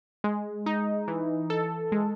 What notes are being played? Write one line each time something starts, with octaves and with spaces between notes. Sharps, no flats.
G#3
D#4
E3
A4
G#3